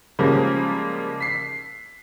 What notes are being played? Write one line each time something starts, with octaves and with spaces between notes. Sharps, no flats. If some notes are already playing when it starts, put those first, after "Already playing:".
C#3 F3 G3 G#3 A#3 C#4
B6 C7